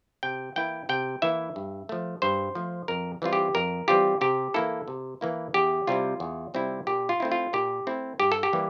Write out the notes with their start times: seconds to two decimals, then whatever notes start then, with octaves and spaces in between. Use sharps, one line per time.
0.23 C3 G5
0.56 E3 A#3 E4 G5
0.89 C3 G5
1.22 E3 A#3 E4 E5
1.56 G2
1.89 F3 A3
2.22 G2 C5
2.55 F3 A3
2.88 F2 A#4
3.22 E3 G3 C4 F4
3.33 G4
3.55 F2 A#4
3.88 E3 G3 C4 F4 G4
4.21 C3 G4
4.54 E3 A#3 E4 A4
4.88 C3
5.21 E3 A#3 E4
5.54 E2 G4
5.87 C3 G3 C4 E4 F4
6.20 E2
6.54 C3 G3 C4 E4
6.87 A#2 G4
7.09 F4
7.20 A3 C4 E4
7.32 F4
7.53 A#2 G4
7.87 A3 C4 E4
8.20 G2 G4
8.32 A4
8.43 G4
8.53 E3 G3 A#3